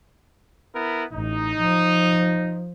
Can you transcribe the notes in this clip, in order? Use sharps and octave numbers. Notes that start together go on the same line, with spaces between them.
B3 E4 A#4
A1 D#4
F3